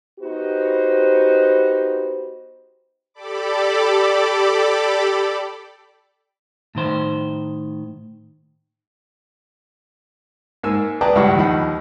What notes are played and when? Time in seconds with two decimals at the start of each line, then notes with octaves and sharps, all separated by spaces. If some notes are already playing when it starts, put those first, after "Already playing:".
0.20 B3 D#4 F#4 G4 C5
3.14 G4 A4 D5 B5 D6
6.75 A2 D#3 C5
10.63 G#2 A#3 G#5 E6
11.01 G#4 B4 D5 G5 A5 A#5
11.15 C#2 G2 G3 E4 F#5 C#6
11.35 D#2 F3 D#4 F#5 B5